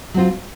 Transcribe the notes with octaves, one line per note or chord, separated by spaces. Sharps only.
F#3 C4 F4